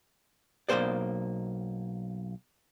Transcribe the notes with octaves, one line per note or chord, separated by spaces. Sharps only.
B1 F2 A#3 C5 D5